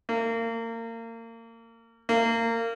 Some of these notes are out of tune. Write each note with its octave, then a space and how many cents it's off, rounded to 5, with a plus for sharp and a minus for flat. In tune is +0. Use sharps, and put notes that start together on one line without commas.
A#3 -30
A#3 -25